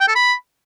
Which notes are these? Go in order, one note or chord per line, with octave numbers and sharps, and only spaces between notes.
G5
A4
B5